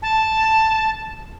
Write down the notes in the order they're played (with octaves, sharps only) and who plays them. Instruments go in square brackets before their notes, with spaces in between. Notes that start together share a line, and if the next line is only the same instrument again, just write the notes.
[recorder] A5